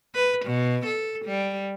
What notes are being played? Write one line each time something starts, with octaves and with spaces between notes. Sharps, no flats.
B4
B2
A4
G3